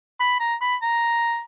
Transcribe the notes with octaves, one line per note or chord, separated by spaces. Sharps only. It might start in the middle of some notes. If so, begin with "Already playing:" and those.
B5
A#5
B5
A#5